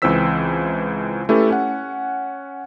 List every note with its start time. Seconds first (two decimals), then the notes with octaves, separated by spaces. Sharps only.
0.02 C#2 E3 C4 C5 E6 B6
1.29 A3 C#4 E4 G4 A4 B4
1.50 C#4 F#5